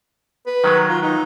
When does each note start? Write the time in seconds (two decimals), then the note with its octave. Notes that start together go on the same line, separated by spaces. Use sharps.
0.47 B4
0.64 D#3 F#3 G#3
0.89 F4
1.03 D#4